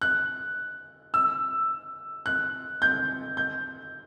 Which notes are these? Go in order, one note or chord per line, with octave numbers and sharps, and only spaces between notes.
F#6
E6
F#6
G6
G6